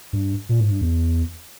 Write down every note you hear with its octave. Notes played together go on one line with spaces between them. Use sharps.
G2
A#2
G#2
G2
E2